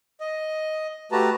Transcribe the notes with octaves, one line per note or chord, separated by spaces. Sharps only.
D#5
A3 F#4 G4 B4 A5 A#5